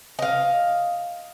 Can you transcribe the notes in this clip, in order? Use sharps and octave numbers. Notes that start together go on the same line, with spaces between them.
D#5 F5